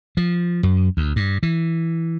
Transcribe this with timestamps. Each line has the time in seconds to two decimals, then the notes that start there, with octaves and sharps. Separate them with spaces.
0.17 F3
0.63 F#2
0.97 D2
1.16 G2
1.43 E3